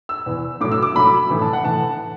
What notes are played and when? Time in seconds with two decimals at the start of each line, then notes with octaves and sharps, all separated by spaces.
0.09 E6
0.26 E2 E3
0.60 A2 F#3 D6
0.72 E6
0.82 D6
0.95 A2 F#3 B5
1.30 A2 E3
1.42 A5
1.53 F#5
1.65 A2 E3 A5